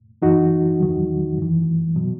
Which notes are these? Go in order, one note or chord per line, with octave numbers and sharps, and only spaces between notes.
F#2 E3 D#4 F#4
E2 D#3 F#3
F#2 E3
B2 F#3